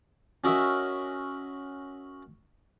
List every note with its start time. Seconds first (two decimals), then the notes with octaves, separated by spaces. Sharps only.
0.44 C#4 F#4 A#4 D#5 E5